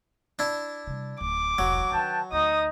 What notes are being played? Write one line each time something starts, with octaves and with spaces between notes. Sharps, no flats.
D4 E4
C3 G3
D1 D6
E1 C2 F#3
D#3 D4 B4 G5 A5
D2 D#4 D#5 D#6